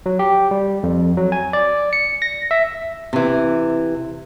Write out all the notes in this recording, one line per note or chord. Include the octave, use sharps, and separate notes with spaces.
F#3
G4
G3
F2
F#3
G#5
D5
C#7
A#6
E5
C3 E3